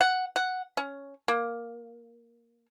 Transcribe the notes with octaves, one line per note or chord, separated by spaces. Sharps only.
F#5
F#5
C#4
A#3